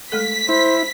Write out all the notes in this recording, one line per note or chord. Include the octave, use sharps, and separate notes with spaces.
G#3 A3 A4 B6
E4 C5